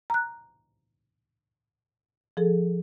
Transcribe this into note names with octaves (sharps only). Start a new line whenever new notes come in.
A#5 F#6
F3 G#4 A4